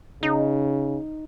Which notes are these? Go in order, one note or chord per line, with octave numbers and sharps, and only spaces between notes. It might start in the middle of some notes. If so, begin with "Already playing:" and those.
C#3 D#4